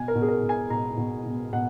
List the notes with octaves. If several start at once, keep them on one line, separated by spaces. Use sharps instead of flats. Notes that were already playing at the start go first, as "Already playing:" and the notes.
Already playing: B2 G#5
A#4
B2
G#4
A#4
B2
G#5
B2 A#5
B2
B2
B2 F#5